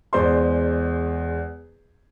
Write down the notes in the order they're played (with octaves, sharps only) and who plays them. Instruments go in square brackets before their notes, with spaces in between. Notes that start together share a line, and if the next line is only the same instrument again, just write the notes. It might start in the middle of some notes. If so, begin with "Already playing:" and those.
[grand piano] E2 G#3 C5 D5 C6